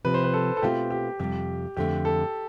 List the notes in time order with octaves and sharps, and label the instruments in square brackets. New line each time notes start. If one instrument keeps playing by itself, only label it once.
[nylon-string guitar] C3 F3 C4 [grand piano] B4
[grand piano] C5
B4
A4
A4
[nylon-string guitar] B2 A3 C4 F4 [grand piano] G4
[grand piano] G4
[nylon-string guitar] F2 C3 G3 [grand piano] G4
[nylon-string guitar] F2 D3 A3 [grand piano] G4
[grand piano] A4